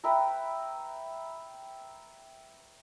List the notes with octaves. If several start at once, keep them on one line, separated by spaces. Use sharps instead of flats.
B4 E5 G5 A#5